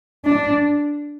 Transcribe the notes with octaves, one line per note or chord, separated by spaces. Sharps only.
D4